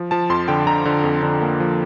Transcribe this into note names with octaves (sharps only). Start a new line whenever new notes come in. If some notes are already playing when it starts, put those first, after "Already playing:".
Already playing: F3
F3 A5
F2 C6
D3 G5
D3 A#5
D3
F2
D3
A#3
F3